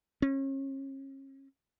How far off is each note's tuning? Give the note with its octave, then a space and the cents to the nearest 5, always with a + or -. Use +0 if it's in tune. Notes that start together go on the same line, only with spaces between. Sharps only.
C#4 -35